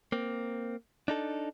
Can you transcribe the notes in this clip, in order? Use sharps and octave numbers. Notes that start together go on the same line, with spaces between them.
A#3 C4
D4 D#4 A4